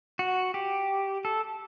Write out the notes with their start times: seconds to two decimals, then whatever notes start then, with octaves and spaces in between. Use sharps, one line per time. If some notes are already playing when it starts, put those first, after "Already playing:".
0.19 F#4
0.54 G4
1.25 A4